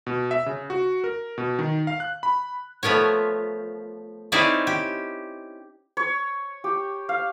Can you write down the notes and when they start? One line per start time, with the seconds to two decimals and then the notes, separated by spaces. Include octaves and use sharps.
0.07 B2
0.31 E5
0.46 C#3
0.70 F#4
1.04 A#4
1.38 B2
1.59 D#3
1.87 F5
2.00 F#6
2.23 B5
2.83 F3 A3 B3 A#4 C#5
4.32 C4 C#4 D#4 E4 G#4 D5
4.67 G4
5.97 C#5
6.64 G4
7.09 F5